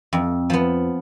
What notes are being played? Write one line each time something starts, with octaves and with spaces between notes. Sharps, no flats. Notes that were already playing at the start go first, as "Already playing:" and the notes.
F2
F3 B3